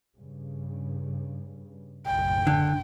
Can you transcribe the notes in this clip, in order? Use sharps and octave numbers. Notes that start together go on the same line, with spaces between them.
G2 C#3
F#1 B1 A2 G5
D3